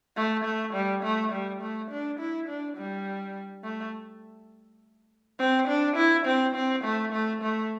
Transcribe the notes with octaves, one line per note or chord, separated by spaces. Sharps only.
A3
A3
G3
A3
G3
A3
D4
E4
D4
G3
A3
C4
D4
E4
C4
C4
A3
A3
A3